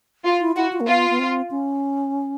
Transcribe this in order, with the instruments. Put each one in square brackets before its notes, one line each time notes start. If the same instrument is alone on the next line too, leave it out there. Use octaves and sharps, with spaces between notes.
[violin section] F4
[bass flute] E4
[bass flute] E4 [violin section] F#4
[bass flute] F4
A#3
[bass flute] B3 [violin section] F4
[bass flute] B3
C4
C#4